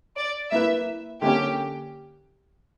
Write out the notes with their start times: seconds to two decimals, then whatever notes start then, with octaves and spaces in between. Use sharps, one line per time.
0.16 D5
0.51 A#3 E4 B4 E5
1.22 D3 A#3 C#4 G4